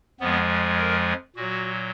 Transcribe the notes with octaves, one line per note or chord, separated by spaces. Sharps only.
F2 F3 G#3 B3
A#4
A#2 F#3 F#4